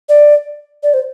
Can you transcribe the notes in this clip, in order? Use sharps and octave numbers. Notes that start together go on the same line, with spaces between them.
D5
D5
C5